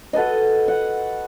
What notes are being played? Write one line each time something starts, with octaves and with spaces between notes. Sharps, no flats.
F#4 A4 B4 D#5
F#5